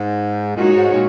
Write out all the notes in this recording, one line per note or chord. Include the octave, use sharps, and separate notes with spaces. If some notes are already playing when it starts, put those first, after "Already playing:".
Already playing: G#2
A#2 G#3 D#4 F#4 C#5
G#2
A#2